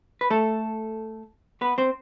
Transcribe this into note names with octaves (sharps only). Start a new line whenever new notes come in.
B4
A3 A4
B3 B4
C4 C5